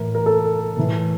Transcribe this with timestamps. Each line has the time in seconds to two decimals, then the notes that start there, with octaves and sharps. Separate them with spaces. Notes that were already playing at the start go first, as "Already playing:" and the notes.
Already playing: A2 E3 A#4
0.15 A#4
0.26 A4
0.77 A2 E3